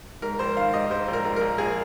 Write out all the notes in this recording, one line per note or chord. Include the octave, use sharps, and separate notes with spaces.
G#2 A#4
A#1 C5
D#3 F5
G#2 D#5
G#2 C5
A#1
A#4
A#1
A#1 A#4
A#1 G#4